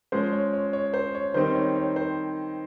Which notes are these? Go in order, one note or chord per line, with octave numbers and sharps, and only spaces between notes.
F3 G#3 C#4 C5
C#5
C#5
C#5
C5
C#5
D#3 G3 C4 D#4 C5
C#5
C#5
C5